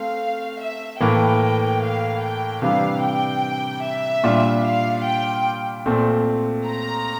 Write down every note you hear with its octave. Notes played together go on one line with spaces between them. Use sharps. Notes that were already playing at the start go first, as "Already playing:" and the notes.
Already playing: A3 C4 F5
E5
A2 E3 A#3 G5
F5
G5
C3 E3 G3 D4 F5
G5
E5
A#2 G3 D4 F4
F5
G5
A#2 A3 C4
A#5